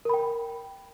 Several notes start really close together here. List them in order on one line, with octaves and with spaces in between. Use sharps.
A#4 B5 G5